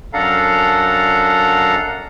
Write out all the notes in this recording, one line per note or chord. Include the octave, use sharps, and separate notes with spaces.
F#2 D4 A4 F5 F#5 A#5